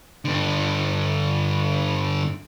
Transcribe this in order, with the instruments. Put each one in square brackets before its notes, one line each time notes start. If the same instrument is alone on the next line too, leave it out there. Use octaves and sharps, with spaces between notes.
[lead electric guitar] G2 D3